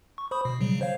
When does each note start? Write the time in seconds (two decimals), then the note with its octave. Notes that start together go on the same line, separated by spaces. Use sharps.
0.18 C#6
0.31 C5 B5 D#6
0.45 B2
0.61 C#3 F#3 G3
0.81 C5 C#5 F5